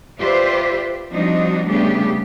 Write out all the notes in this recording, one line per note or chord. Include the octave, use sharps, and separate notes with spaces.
F4 G4 B4 C5 D5 E5
F3 G3 C4 D4 D#4 F#4
C#3 G3 A3 B3 D4 G4